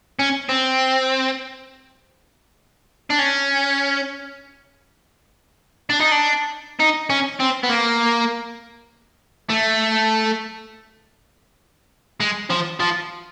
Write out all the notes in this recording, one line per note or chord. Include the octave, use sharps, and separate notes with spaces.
C#4
C4
D4
C#4
D4
D#4
D4
D#4
C#4
C4
B3
A#3
A3
G#3
F3
F3